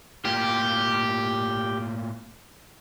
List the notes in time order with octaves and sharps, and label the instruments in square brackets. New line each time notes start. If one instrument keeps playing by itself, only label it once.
[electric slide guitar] A2 A#3 F4 [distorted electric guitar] G4